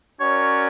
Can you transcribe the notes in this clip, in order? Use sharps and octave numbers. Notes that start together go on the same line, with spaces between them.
C#4 F#4 A#4 C#5 D5